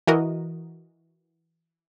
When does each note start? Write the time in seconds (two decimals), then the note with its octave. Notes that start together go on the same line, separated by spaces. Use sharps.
0.07 E3 F#4 A#4 D#5